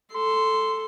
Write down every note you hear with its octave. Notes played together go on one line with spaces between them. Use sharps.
A4 C6